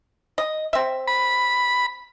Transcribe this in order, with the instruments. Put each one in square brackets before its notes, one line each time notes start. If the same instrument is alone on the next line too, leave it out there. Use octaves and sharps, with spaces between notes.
[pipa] D#5
C4 E5
[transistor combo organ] B5